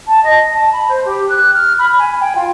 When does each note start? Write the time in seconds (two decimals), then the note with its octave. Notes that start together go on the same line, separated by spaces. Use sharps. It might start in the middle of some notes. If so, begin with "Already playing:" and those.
0.07 A5
0.24 D#5
0.55 A5
0.72 B5
0.88 C5
1.05 G4
1.29 F#6
1.55 F6
1.79 B5
1.98 G#5
2.21 G5
2.35 F4